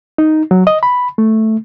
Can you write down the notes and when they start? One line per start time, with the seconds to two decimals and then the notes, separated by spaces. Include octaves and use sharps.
0.18 D#4
0.51 F#3
0.67 D#5
0.83 B5
1.18 A3